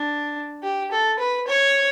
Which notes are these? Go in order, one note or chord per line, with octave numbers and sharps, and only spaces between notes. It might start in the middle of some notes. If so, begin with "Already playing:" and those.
Already playing: D4
G4
A4
B4
C#5